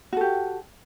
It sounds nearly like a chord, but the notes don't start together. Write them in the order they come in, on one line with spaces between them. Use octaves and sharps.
F#4 A4 G4